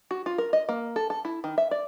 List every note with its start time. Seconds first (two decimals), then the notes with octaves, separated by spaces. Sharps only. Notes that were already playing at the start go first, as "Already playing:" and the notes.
0.11 F#4
0.26 F4
0.38 A#4
0.53 D#5
0.69 A#3
0.96 A4
1.10 A4
1.25 E4
1.44 D#3
1.58 E5
1.71 D5